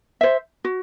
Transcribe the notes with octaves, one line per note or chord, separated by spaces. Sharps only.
C5 E5
F#4